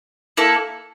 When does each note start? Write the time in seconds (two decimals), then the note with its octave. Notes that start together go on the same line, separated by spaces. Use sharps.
0.37 A#3 E4 A4